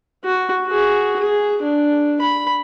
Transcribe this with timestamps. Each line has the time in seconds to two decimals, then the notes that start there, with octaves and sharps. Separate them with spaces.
0.24 F#4
0.67 F#4 G#4
1.19 G#4
1.63 D4
2.22 B5